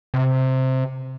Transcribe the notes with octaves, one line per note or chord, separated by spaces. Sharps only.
C3